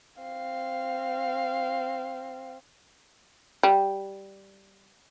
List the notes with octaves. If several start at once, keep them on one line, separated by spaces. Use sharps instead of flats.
C4 F5
G3